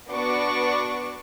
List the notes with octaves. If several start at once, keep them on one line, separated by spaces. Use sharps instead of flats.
B3 D4 F#4 D5 C#6 D6